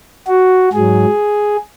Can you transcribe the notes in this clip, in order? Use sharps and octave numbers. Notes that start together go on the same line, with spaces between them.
F#4
G#2 F#3 G#4